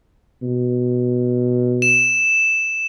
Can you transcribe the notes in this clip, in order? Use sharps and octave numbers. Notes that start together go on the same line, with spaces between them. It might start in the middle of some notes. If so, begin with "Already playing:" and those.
B2
E7